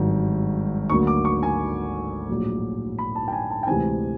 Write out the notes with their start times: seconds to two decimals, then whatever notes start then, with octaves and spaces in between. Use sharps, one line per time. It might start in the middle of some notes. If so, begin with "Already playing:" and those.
Already playing: G#1 G2 D#3 F#3
0.90 D2 D3 F#3 A#3 C#6
1.07 D6
1.25 C#6
1.43 G#5
2.29 A#1 A2 F#3
2.99 B5
3.16 A5
3.28 G5
3.32 G#5
3.51 A5
3.63 G5
3.67 D2 C3 E3 G#3 C4 G#5